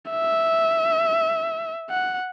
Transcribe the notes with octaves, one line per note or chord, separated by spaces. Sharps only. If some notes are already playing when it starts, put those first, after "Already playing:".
E5
F#5